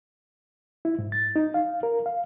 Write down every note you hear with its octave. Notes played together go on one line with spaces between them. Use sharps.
E4
G#2
A6
D#4
F5
A#4
F5